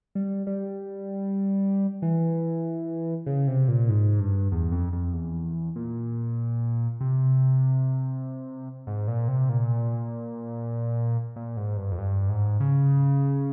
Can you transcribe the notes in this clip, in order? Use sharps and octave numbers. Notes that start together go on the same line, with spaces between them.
G3
G3
E3
C#3
C3
A#2
G#2
G2
E2
F2
F2
E2
A#2
C3
G#2
A#2
C3
A#2
A#2
G#2
G2
F2
G2
G#2
C#3